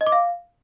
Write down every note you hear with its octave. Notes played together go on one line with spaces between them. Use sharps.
D#5
D6
F5